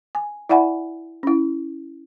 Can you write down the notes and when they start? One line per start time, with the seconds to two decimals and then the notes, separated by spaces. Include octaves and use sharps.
0.15 G#5
0.49 E4 D5 E5 F#5 G#5 B5
1.23 C#4 E4